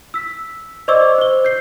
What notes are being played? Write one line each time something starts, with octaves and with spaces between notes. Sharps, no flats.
E6 B6
C5 D5 D#5 C#6 D6 E6
C5 G7
G6 C7